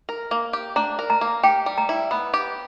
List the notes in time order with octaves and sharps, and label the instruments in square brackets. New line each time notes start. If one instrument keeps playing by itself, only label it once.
[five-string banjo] A#4
A#3
G4
[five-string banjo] D4 [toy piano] A#5
[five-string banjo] A#4
[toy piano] A#5
[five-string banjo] A#3
[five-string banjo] G4 [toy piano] G5
[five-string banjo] G3
[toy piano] A#5
[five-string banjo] E4
[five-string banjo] B3 [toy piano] B5
[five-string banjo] G4